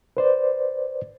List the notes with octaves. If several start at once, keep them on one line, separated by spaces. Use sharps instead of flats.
B4 C5 D5